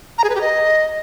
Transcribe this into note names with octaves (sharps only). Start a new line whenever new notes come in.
A#5
G#4
B4
G4
D#5